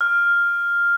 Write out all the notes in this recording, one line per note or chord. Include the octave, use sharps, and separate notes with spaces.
F6